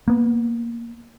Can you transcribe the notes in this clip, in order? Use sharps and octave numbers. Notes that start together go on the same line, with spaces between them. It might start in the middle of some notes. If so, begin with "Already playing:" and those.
A#3 B3